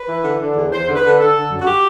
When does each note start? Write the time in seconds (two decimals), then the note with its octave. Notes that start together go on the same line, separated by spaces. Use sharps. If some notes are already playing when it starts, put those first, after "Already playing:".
Already playing: B4
0.09 E3
0.24 D3
0.40 D3
0.56 E2
0.72 E2 C5
0.88 D3
0.95 B4
1.04 D3
1.19 D3 A4
1.35 D3
1.51 F#2
1.61 F#4
1.66 G4